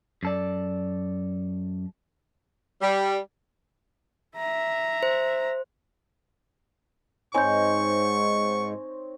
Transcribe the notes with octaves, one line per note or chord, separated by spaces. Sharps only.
F#2 A4 D5
G3
E5 A#5
C5
G#2 C4 D#4 C#5 G#5 C#6 G6